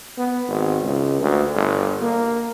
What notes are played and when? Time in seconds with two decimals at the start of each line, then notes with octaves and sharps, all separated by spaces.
0.18 B3
0.48 G#1
0.83 C#2
1.21 D2
1.55 G1
2.02 A#3